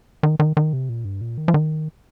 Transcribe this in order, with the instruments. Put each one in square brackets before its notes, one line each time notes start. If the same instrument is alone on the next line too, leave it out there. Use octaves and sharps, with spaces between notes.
[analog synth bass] D#3
D#3
D#3
C3
A#2
G2
A#2
D#3
F3
D#3